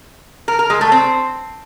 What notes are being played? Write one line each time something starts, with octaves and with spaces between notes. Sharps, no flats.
A#4
A#4
G#3
A3
C4